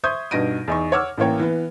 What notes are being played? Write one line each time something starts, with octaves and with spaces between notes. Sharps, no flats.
C5 E5 C#6 D#6 G6 G#6
G2 B2 D#4 A#6 D7 D#7
E2 D#4 C#6
C#5 F#5 D6 E6 F6
A1 E3 A#3 C#5 G5
E3 B3